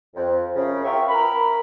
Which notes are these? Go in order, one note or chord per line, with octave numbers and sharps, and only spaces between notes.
F2
F#2 C#3
F4 F#4 A#4 E5 G5 C#6
A#4 B5